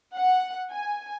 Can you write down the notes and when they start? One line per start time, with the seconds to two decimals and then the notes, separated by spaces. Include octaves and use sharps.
0.17 F#5
0.71 G#5